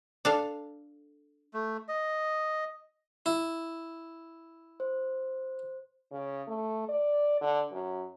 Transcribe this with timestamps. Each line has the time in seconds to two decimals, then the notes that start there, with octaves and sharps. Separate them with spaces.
0.25 D4 A4 F5
1.54 A3
1.88 D#5
3.26 E4
4.80 C5
6.12 C#3
6.48 A3
6.89 D5
7.41 D3
7.72 F#2